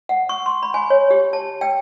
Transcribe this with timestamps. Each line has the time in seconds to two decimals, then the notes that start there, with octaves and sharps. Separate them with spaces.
0.09 F#5
0.29 C#6
0.46 C6
0.63 B5
0.74 G#5
0.90 C#5
1.11 G4
1.33 A5
1.61 G5